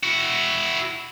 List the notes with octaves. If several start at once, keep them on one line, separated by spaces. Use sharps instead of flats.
E4 F#4